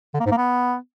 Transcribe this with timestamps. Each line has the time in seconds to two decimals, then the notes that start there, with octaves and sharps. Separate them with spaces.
0.14 D3
0.20 A#3
0.26 G#2
0.32 A#3
0.37 B3